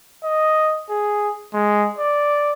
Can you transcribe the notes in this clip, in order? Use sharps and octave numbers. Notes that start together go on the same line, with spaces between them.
D#5
G#4
G#3
D5